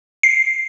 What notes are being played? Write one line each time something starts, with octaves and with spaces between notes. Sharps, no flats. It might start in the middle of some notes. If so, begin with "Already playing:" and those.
C7